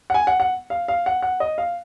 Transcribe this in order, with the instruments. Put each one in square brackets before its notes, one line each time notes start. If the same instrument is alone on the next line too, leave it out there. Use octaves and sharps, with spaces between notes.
[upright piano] F#5
G#5
F#5
F#5
F5
F5
F#5
F#5
D#5
F5